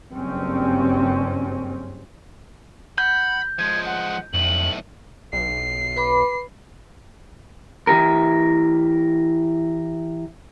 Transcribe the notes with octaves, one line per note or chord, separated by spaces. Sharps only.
F#1 G2 C4 C#4
F#5 B5 G6
F3 G#3 G#6
F#5
B1 F2 A2 F#7
B1 C7
B4 B5 D6
E3 E4 G4 A#4